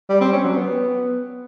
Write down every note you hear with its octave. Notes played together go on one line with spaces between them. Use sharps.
G3
C4
C#4
F#3
B3